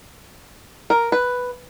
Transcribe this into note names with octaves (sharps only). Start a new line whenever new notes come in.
A#4
B4